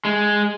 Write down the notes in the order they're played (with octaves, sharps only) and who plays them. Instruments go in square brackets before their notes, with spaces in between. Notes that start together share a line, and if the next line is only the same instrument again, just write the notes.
[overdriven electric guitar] G#3